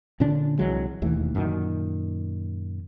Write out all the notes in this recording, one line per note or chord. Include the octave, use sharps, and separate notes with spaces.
A#2 D3 C#4 D4
C2 E3 F#3 G#3
E1 D#2 E3 A3
F#2 A#2 D#3